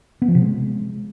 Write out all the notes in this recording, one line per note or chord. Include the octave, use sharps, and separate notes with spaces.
B3
F3
C3
G#3